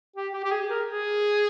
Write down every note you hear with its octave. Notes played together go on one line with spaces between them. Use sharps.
G4
G4
G4
G#4
A#4
G#4